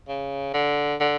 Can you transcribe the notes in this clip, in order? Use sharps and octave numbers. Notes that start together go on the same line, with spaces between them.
C#3
D3
D3